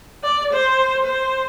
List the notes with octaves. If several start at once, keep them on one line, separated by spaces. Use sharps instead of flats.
D5
C5
C5